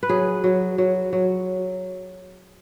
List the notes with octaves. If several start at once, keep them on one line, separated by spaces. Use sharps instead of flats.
B4
F#3 G#4
F#3
F#3
F#3